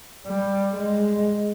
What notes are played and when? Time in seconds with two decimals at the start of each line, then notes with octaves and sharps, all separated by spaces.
0.27 G3
0.77 G#3